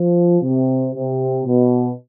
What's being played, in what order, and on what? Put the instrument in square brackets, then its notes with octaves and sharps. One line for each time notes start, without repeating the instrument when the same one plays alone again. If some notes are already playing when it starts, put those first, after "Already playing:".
Already playing: [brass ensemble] F3
C3
C3
B2